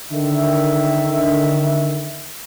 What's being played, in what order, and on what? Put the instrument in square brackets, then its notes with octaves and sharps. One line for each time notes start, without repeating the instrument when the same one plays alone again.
[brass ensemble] D3 D#3 E5